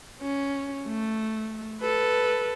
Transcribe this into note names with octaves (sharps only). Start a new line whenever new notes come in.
C#4
A3
A4 B4